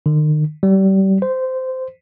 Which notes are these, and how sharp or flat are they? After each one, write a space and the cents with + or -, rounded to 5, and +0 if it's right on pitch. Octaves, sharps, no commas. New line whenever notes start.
D#3 -40
G3 -30
C5 -15